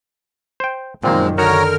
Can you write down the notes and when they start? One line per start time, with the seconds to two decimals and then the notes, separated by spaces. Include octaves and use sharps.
0.60 C5 G5
1.04 F#2 A#2 D#3 F3 G#3 A#3 C4
1.38 D3 C#4 D#4 F#4 A#4 C#5 A#5 F6